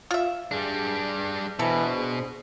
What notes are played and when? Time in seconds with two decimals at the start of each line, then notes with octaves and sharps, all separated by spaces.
0.11 F4 E5
0.51 G2 G3 D4 G#4
1.59 B2 E3 D4 A4 C5
1.96 G#4